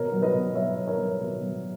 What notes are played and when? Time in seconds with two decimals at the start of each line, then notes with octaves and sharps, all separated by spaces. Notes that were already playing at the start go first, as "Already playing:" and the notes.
Already playing: B2 A#4 C#5
0.12 F#3
0.22 B4 D#5
0.34 B2
0.55 F#3 C#5 E5
0.77 B2
0.87 A#4 C#5
0.98 F#3
1.20 B2
1.41 F#3